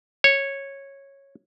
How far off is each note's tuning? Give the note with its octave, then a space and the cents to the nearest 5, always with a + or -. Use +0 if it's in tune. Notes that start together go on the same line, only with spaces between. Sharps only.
C#5 -10